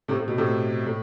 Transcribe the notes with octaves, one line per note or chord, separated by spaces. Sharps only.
A2 C3
A2
B2
A2 C3
A2